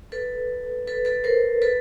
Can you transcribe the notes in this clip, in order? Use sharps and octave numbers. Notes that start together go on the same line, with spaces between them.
A4 B4
A4 B4
A4 B4
A#4 C5
A4 B4